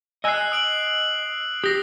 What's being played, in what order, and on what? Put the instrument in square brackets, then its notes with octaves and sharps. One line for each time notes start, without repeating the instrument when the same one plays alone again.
[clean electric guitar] D#5 G#5 [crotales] E6 F#6 C7
[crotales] D#6 D7 F#7
[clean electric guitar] G4 [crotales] D#6 A#6 C7